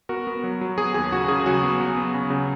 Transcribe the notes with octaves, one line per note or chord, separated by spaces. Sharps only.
B3 F#4 A#4
B3
F#3
F#3
B3 G#4
D#2 G#4
C#3 F#4
C#3 G#4
F#3 F#4
B3
F#3
B3
C#3
C#3